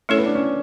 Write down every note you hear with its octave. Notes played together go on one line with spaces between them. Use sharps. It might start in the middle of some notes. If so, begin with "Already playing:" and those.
A3 C#4 E4 A4 C#5
B3
D4
C#4